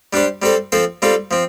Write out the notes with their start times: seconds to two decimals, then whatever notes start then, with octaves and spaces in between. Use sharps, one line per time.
0.13 G3 D4 G4 C5
0.42 G3 C4 A4 C5
0.72 F3 C4 A4 C5
1.02 G3 C4 F4 A4
1.31 F3 C4